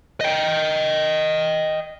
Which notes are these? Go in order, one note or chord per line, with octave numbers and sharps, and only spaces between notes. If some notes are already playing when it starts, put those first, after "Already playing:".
D#5 G5